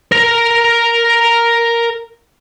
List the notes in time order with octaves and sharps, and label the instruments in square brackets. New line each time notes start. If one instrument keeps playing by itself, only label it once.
[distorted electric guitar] A#4 A#5